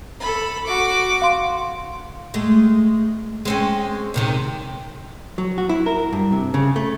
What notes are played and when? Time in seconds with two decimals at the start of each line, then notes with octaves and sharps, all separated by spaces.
0.20 A4 B5
0.66 F#4 D6
1.22 F5 C6
2.34 G#3 A3
3.45 G#3 C4 C#4
4.14 D#2 C3 D#3
5.38 F#3
5.58 F#4
5.69 E4
5.86 A#4
6.13 G2
6.32 C3
6.54 C#3
6.76 A3